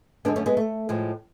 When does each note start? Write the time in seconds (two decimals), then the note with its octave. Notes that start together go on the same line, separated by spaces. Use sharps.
0.25 F#2 D3 G#3 B3 D4
0.36 A3 C#4
0.46 G#3 B3
0.57 A3
0.89 A2 F3 G#3